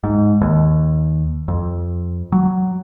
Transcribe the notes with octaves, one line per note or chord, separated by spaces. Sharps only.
G#2
D#2
F2
F#3